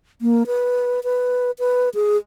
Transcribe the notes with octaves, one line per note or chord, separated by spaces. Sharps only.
A#3
B4
B4
B4
G#4